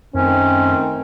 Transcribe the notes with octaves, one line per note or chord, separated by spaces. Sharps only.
F#2 D#3 A3 C4 C#4